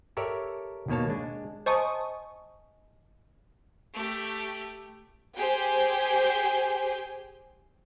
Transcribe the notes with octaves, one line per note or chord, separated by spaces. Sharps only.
G4 A4 A#4 C#5 D5 E5
D#2 B2 A#3 C#5 A5
G#3 D4
C5 D#5 G#5 A5 C#6 D#6
A3 G4
G4 G#4 C5 G5 G#5